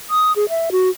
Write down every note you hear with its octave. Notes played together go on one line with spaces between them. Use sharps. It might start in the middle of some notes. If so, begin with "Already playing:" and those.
D#6
G#4
E5
F#4